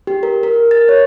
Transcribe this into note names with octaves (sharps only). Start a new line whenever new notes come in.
G4
A#4
A#4
A6
C#5